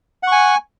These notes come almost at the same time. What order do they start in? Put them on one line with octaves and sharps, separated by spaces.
F#5 C#6 G#5